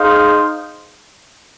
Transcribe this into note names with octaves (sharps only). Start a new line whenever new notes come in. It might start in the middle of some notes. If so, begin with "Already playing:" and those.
Already playing: D#4 G#4 C5 F5